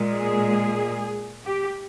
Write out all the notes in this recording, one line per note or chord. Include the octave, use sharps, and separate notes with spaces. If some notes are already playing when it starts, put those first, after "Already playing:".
Already playing: A#2 G#3
G#4
G4